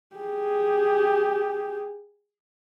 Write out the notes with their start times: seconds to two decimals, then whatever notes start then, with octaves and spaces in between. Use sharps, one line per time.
0.16 G4 G#4